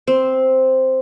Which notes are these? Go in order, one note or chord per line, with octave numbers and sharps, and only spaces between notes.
C4